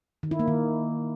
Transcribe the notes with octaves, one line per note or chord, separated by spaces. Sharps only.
D#3
E4
A#3
D#3